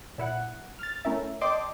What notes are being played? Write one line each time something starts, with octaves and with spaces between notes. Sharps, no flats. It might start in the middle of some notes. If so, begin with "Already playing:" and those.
A#2 E4 F#5
F6 A6
A3 C#4 E4 A#4 E5
D5 D#5 G5 A5 C6 D6